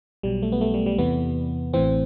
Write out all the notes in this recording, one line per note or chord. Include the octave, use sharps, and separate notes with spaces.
B1 B2 F#3 G3
A3
B3
A3
G3
G3
E2 C3 E3 B3
A1 A2 E3 C4